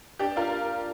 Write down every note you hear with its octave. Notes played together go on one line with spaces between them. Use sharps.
D4 G4
D4 F4 A#4